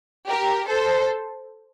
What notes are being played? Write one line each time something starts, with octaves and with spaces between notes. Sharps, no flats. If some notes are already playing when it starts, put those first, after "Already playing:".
G4 A#4
A4 C5